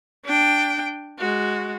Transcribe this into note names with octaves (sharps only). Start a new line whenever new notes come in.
D4 G5
G#3 F#4